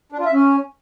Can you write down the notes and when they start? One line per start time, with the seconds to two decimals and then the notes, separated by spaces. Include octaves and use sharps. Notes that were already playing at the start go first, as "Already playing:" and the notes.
0.12 D4
0.19 F4
0.26 E5
0.32 C#4